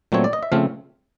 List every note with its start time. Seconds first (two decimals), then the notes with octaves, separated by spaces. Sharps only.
0.12 A#2 F#3 A3 C4 C#5
0.24 D5
0.33 D#5
0.43 E5
0.52 C#3 F3 A3 C4 F5